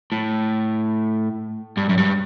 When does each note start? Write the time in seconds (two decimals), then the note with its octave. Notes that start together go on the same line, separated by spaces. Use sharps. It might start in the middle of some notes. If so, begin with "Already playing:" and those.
0.12 A2
1.77 G2
1.89 F#2
1.98 G2